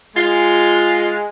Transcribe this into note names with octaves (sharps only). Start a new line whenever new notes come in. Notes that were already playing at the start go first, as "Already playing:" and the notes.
G#3 F4